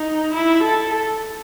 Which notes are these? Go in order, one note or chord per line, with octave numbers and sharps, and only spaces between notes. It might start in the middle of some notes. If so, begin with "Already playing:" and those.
Already playing: D#4
E4
A4